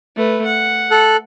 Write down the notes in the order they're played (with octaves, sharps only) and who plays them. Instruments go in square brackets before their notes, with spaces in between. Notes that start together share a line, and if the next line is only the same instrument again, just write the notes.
[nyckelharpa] A3 B4
F#5
[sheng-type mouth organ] A4 F#6